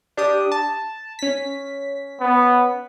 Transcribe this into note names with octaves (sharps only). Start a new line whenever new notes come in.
D4 G4 D#6
A5
C#4 B6
B3